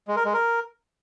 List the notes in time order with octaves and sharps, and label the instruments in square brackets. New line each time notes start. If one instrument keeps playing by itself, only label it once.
[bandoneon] G#3
A#4
G#3
A#4